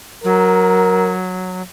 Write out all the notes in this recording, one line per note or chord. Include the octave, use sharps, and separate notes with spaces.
F#3 A#4